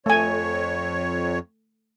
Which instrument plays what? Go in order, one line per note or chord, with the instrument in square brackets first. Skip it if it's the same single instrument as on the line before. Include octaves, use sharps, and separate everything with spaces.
[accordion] F2 C#5 [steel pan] A3 G#5